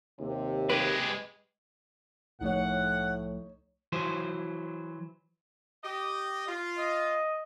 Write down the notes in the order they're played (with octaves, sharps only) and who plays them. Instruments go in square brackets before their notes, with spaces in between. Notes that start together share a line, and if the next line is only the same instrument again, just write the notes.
[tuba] D#2 [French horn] C3
[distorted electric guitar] G#3 G4 [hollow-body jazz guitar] B4
[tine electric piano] C2 F3 A3 [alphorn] A2 [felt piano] D#4 C#5 [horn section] F#5
[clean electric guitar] E3 F#3 C5
[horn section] G4 D#5
F4
[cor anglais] D#5